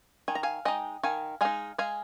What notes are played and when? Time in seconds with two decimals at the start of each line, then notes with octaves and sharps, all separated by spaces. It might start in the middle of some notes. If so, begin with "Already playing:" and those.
0.28 D#3 G#5
0.35 A#5
0.43 F5 G#5
0.65 G#3 D#4 D#5 G5
1.03 D#3 F5 G#5
1.41 G#3 D#4 F5 G#5
1.78 G#3 F5 G#5